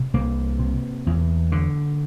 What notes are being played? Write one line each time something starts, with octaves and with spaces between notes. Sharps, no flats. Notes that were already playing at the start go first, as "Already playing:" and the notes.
Already playing: C3
C2 A#3
C3
E2
D3